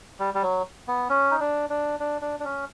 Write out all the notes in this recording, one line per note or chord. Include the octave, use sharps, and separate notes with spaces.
G3
G3
F#3
B3
C#4
D#4
D4
D4
D4
D4
D4
C#4